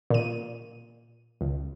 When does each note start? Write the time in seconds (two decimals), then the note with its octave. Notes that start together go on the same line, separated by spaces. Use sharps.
0.10 A#2 D#7
1.41 C#2